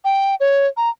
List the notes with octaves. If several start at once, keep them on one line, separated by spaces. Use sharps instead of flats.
G5
C#5
A#5